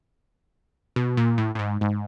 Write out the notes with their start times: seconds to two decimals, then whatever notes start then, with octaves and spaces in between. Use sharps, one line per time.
0.96 B2
1.17 A#2
1.38 A2
1.55 A2
1.59 G#2
1.81 G#2